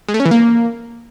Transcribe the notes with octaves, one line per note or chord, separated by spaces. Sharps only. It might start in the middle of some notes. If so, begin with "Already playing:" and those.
G#3
A3
C#4
E3
A#3